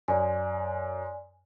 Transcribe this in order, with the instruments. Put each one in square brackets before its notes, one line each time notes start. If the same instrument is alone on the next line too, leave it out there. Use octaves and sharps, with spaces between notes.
[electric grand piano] F#2 [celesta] D5 G#5